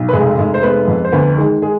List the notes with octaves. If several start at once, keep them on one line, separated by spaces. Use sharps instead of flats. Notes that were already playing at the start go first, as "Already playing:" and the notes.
Already playing: B1
B4
F1 G#3 G#4
F1 G#3 G#4
C5
G#3 B3 B4
F2
C5
D2 B3 B4
D#3 G#3 G#4
G#3 G#4